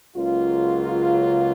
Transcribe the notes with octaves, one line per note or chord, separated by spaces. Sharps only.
C#2 C#3 F#3 A#3 F4